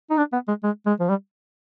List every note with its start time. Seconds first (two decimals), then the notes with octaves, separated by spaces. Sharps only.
0.10 D#4
0.18 D4
0.33 B3
0.48 G#3
0.63 G#3
0.86 G#3
1.00 F3
1.09 G3